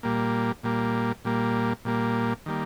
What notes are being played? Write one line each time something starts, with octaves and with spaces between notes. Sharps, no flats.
A#2 G3 A#3
A#2 G3 A#3
A#2 G3 A#3
A#2 G3 A#3
D#3 G3 A#3